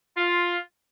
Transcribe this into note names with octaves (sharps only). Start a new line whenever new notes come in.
F4